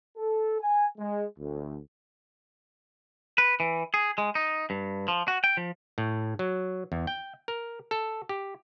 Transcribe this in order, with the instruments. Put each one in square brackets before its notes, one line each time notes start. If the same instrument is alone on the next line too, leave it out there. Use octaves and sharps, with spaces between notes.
[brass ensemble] A4
G#5
G#3
D2
[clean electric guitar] B4
E3
G#4
G#3
D#4
G2
F3
F#4
G5
F3
[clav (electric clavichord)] A2
F#3
E2
G5
A#4
A4
G4